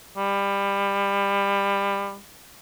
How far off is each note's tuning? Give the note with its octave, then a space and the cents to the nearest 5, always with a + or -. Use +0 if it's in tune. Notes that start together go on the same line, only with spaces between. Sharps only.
G3 +25